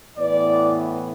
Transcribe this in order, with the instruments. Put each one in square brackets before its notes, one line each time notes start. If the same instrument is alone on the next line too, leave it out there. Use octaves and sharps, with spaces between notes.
[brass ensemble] A2 E3 B3 D5